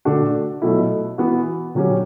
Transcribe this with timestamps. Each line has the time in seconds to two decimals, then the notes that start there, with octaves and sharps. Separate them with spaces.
0.05 D3 A3 D4 F#4
0.62 B2 F#3 A3 E4
1.18 E3 B3 F#4
1.75 D3 F#3 C#4 G4